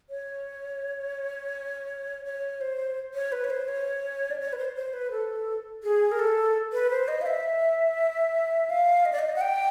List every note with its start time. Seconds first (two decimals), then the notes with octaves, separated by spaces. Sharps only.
0.10 C#5
2.25 C#5
2.61 C5
3.14 C#5
3.32 B4
3.44 C#5
3.50 C5
3.68 C#5
4.31 D5
4.40 C#5
4.53 B4
4.58 C5
4.75 C5
4.93 B4
5.11 A4
5.83 G#4
6.11 A#4
6.19 A4
6.73 B4
6.90 C5
7.08 D#5
7.21 F5
7.26 E5
8.70 F5
9.05 D#5
9.12 D5
9.19 D#5
9.36 F#5
9.41 G5